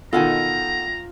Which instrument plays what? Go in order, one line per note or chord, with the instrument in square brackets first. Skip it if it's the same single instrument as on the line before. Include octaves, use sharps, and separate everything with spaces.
[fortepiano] B2 D#3 [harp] F4 [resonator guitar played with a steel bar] A4 F#5 G#5 [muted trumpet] A#5